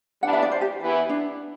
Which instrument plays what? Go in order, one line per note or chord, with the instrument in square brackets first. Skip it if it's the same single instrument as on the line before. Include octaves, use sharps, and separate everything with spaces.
[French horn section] E3 G3 B3 D4 [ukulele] F#5
[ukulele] E5
D5
C5
G4
[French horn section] E3 B3 E4
[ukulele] D4